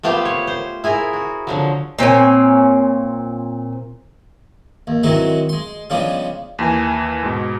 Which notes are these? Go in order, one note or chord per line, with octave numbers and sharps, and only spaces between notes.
A3 B3 F4 G4 C5 F5
C#5
C5
E4 G#4 A#4
F#4
D3 F3 F#3
A#2 C4 C#5 G#5
D#2
D#3 E3 F#3 G#3 C4 F#4
G#3 C6
C#3 F3 G3 G#3 B3 D4
D#2 E3 G#5
G#2 B2